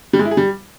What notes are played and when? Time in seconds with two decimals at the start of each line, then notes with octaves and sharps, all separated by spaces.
0.13 G3
0.19 G#3
0.25 E4
0.31 G#4
0.37 G3